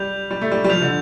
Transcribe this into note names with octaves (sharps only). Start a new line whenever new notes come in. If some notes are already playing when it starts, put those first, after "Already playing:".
Already playing: G3 G6 F7
G3
A3
G3
G3
F3 G6 F7
D3